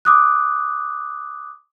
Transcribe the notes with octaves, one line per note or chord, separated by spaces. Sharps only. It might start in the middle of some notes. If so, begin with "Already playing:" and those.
D6 D#6 F#6